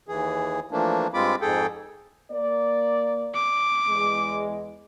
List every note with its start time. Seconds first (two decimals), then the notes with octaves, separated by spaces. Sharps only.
0.08 D#2 E3 G#4
0.71 E3 F3 A3 A#3 D4
1.14 G2 G#3 C4 F4 B5 D6
1.41 F2 G#2 G#4 A4 G5
2.31 A#3 D5
3.34 D6
3.89 E2 G#3